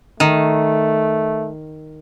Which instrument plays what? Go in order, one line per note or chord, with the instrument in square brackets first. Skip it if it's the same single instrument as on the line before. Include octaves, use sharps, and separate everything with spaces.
[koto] D#3 [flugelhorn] A3